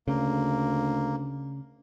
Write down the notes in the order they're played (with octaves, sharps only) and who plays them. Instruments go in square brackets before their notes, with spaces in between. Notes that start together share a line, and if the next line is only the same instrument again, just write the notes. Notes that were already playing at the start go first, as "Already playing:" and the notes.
[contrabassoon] D2 [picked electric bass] C#3 [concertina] A#3